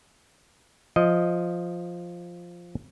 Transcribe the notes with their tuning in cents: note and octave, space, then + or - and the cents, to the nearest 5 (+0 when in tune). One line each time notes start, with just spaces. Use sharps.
F3 +0 D#5 +0